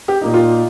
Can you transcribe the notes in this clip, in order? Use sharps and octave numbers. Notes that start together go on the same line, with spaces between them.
G4
A#2 A#3 D#4
F4